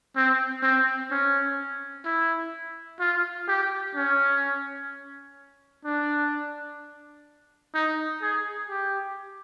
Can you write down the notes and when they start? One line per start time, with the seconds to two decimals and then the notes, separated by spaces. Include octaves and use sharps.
0.16 C4
0.63 C4
1.11 C#4
2.05 E4
3.00 F4
3.48 G4
3.95 C#4
5.85 D4
7.74 D#4
8.22 G#4
8.69 G4